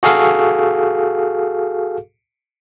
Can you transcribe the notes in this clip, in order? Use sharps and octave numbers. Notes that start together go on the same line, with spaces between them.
F#4 G#4 A4 F5